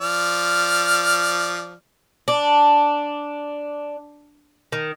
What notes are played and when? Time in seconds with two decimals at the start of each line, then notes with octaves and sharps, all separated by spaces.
0.01 F3 D5 F6
2.28 D4
4.72 D#3